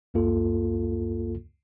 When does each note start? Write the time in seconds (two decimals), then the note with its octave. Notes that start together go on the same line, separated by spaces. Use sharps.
0.14 C#2 F#2 A#3 F4 A4